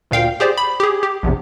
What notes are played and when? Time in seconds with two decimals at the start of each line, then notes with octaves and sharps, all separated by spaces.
0.11 D2 A#2 F5 G5
0.40 G4 G#4 C5 D5
0.58 B5
0.80 G4 G#4
1.03 G4
1.23 A#1 E2 C3